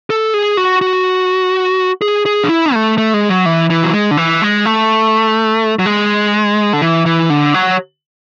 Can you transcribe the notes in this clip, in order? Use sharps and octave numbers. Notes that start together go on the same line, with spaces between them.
A4
G#4
F#4
F#4
G#4
G#4
D4
E4
A3
A3
G#3
F#3
E3
E3
F#3
G#3
D3
E3
G#3
A3
F#3
G#3
D3
E3
E3
D3
F#3